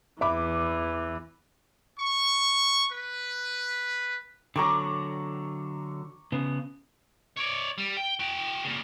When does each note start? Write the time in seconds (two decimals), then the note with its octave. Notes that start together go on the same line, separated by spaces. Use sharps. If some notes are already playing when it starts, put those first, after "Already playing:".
0.21 E2 E3 E5 B5 D6
1.99 C#6
2.92 B4
4.56 D3 F#3 A#5 C#6 D6
6.32 C#3 B3
7.37 C#5 D5
7.78 G3
7.97 G5
8.20 F#4 G5
8.64 A#2 C#3